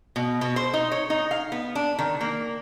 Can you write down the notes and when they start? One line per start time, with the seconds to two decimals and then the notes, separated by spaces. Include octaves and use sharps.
0.16 B2
0.41 B2
0.56 C5
0.74 D#4
0.92 C#5
1.10 D#4
1.31 F5
1.52 B3
1.75 D4
1.99 D#3
2.21 A#3